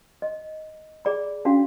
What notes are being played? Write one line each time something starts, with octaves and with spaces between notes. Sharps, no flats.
D#5
G#4 D5 B5
C#4 D4 F#4 F5